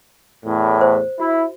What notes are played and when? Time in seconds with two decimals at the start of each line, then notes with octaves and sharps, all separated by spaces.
0.45 E2 A2
0.81 C5
1.20 E4 F#4